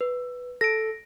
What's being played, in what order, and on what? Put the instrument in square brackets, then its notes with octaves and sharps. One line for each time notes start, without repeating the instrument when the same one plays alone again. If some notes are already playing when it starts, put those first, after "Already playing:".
[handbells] B4
[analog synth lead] A4 [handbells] A#6 D7